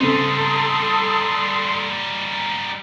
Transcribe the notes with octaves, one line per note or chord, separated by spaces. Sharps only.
C#3 G3 B3 C4 D#4 A4 C6 D#6